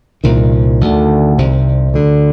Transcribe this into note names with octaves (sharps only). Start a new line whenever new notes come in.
C2 A#2 D#3
D2 D3
C2 C3
D2 D3